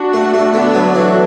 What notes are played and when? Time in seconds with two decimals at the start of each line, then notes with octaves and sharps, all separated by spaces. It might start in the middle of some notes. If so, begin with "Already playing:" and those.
Already playing: D4 F#4
0.13 A3
0.34 A3
0.53 D3 B3 D4
0.74 F#3
0.94 E3 D4 F#4